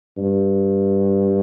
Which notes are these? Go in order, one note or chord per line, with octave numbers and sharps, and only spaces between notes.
G2